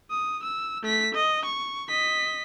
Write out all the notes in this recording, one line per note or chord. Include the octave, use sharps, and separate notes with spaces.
D#6
E6
A3 B6
D#5
C#6
D#5 B6